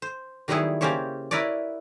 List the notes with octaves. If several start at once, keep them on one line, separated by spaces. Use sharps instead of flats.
C5
D#3 F#3 G3 B3 E4 G#4
C#3 A#3 C#4 G4 C5 C#5
E4 A#4 B4 C#5 D5